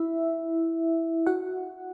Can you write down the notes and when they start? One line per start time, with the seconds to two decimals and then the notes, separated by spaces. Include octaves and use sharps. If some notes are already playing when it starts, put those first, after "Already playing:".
Already playing: E4 E5
1.27 F#4 F#5